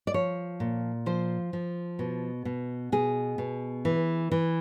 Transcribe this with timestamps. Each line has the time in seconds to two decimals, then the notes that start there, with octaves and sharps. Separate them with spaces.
0.07 D5
0.14 F3 C#5
0.60 A#2
1.06 F3 C5
1.53 F3
1.99 B2
2.45 B2
2.92 B2 G#4
3.38 B2
3.85 E3
4.31 E3